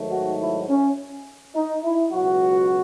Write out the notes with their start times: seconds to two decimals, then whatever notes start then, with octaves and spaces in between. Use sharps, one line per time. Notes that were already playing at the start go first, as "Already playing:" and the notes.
Already playing: G#2 D#3 F#3 A3
0.10 F#4
0.39 E4
0.68 C#4
1.54 D#4
1.83 E4
2.12 C#2 B2 F#3 F#4